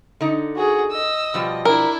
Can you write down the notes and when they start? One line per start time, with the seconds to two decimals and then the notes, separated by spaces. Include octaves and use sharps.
0.21 D3 D#4
0.56 F#4 G#4
0.92 D#5 E6
1.34 B2 F3 G3
1.65 D4 E4 A#4